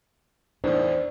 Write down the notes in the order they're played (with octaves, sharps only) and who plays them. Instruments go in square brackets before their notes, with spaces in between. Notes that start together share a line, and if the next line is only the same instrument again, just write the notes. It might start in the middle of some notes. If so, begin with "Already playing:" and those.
[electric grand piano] E2 A2 D#3 [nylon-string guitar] D4 [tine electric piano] C5